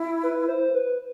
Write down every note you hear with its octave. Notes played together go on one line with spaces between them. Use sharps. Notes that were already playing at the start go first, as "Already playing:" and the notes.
Already playing: E4
B4
C5
B4